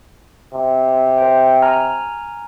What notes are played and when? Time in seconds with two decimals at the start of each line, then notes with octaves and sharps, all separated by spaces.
0.54 C3
1.18 C5 G5
1.62 G#5 A#5 F6